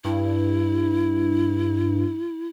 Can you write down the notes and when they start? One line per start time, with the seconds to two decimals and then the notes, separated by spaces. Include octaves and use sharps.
0.04 G2 E4